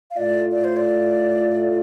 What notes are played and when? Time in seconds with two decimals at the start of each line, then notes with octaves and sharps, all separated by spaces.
0.11 F5
0.17 A2 A3 F4 D5
0.51 D5
0.64 C5
0.77 D5